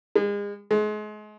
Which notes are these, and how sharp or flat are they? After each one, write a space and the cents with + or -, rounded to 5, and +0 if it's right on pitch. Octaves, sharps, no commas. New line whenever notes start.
G#3 -35
G#3 +35